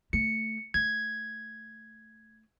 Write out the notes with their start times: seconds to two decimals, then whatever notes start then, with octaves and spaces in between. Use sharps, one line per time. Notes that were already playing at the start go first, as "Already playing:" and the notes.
0.13 A3 C#7
0.74 A3 G#6